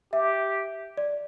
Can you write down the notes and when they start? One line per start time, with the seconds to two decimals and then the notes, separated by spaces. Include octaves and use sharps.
0.13 G4 E5
0.97 D5